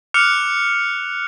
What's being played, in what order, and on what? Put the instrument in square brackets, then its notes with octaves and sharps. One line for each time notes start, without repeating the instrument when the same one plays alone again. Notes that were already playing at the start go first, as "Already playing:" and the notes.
[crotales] D6 F6 F#6 C#7 F7